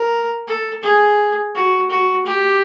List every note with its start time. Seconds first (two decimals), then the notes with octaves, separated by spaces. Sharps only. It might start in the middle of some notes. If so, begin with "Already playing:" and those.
Already playing: A#4
0.47 A4
0.83 G#4
1.55 F#4
1.90 F#4
2.26 G4